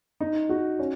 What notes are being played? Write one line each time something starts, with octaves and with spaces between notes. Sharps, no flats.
D#4
F#4
C#4